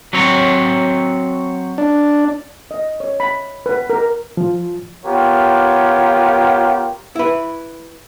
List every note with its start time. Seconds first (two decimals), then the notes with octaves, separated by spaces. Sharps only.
0.13 F#3 C4 C#5
1.78 D4
2.71 D#5
3.00 C#5
3.20 B5
3.66 B4
3.90 A#4
4.37 F3
5.05 B3 F4 G4 A#4 C#5
7.16 E4 B4